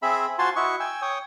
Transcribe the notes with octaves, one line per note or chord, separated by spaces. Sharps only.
C4 G#4 E5 B5
F4 F#4 C5 G#5 A5 C6
E4 F#4 D#5 C#6
G5 G#5 E6
C#5 G5 D#6